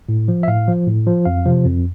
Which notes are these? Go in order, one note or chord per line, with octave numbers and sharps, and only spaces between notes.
A2
F3
E5
A2 F5
F3
A2
F3
F2 F5
C3 F3
F2